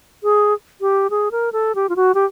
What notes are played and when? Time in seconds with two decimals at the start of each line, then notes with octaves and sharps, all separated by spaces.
0.23 G#4
0.81 G4
1.10 G#4
1.32 A#4
1.53 A4
1.75 G4
1.89 F4
1.96 F#4
2.15 G4